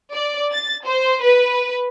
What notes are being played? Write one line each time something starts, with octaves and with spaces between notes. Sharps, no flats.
D5
A6
C5
B4